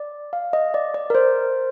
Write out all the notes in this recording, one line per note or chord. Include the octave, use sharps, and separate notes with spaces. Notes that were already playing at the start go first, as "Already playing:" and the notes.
Already playing: D5
F5
D#5
D5
D5
A#4
C5